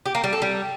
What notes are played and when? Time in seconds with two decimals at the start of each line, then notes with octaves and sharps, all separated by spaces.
0.06 G4
0.15 A#3
0.24 G3
0.33 A4
0.42 G3